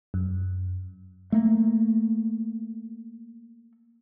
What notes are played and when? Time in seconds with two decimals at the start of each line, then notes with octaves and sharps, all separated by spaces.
0.14 F#2
1.32 A3 A#3